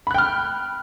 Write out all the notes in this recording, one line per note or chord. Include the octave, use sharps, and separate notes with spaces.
G5 B5 F6 F#6